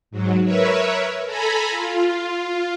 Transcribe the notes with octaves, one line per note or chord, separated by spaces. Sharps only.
G#2 F#3
A#4 B4 C#5 E5
A4 G#5 A#5 B5
F4